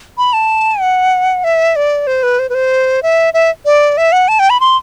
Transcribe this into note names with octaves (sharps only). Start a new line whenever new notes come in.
B5
A5
F#5
E5
D5
C5
B4
C5
B4
C5
E5
E5
D5
E5
F#5
A5
G5
B5
C6